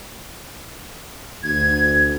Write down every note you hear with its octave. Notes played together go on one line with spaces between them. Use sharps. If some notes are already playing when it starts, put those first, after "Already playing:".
D2 G#6